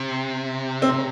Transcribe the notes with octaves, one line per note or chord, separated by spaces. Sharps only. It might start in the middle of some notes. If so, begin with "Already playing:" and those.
Already playing: C3
C4